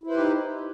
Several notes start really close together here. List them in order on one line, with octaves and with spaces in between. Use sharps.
E4 C5 B4 G4 D#4